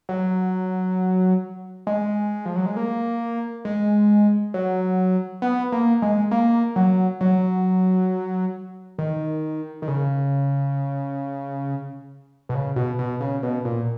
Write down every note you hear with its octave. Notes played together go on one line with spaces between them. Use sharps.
F#3
G#3
F3
F#3
G#3
A#3
G#3
F#3
B3
A#3
G#3
A#3
F#3
F#3
D#3
D#3
C#3
B2
C#3
B2
B2
C#3
B2
A#2